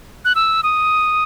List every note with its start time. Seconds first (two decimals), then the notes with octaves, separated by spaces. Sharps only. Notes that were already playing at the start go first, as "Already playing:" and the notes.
0.25 F#6
0.35 E6
0.63 D#6